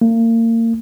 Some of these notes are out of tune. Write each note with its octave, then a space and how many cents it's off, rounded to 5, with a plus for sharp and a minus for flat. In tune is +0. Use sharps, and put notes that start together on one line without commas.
A#3 -35